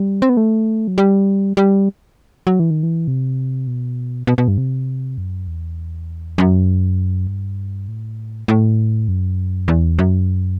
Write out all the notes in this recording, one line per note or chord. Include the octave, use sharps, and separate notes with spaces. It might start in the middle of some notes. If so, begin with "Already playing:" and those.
Already playing: G3
C4
B3
A3
F#3
G3
G3
F#3
E3
D#3
E3
C3
B2
B2
B2
G2
C3
F#2
E2
F#2
G2
A2
A2
F#2
E2
F#2